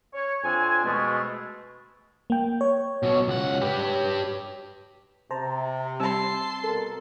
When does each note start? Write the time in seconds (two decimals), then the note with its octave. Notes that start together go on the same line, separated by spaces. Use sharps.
0.14 C#5
0.44 F2 C4 D4 G#5
0.85 B2 G#3 A3
2.30 A#3 G5
2.61 C#5
3.03 B2 F#3
3.28 C#2 F#5
3.62 G4 B4
5.31 C3 C5 A5 A#5
6.00 G3 C4 A5 C6 E6
6.63 B2 A4 A#4